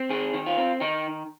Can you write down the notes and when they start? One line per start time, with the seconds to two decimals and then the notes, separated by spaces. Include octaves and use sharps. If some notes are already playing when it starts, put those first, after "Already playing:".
Already playing: C4
0.10 D#3 G#4
0.34 D#3
0.46 F4
0.58 C4
0.81 D#3 D#4